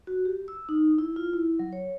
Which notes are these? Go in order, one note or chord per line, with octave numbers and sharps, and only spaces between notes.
F#4
G4
E6
D#4
E4
F4
E4
F#3
C#5